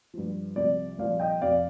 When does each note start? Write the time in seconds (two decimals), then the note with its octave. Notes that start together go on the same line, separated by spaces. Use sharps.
0.14 G2 F3
0.56 C2 C3 F3 D5
0.98 C2 A#2 F3 D5 F5
1.19 D#5 G5
1.41 F2 C3 F3 D5 F5